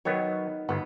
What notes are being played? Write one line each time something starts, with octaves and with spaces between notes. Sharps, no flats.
D#3 F#3 B3 C#5
G1 B3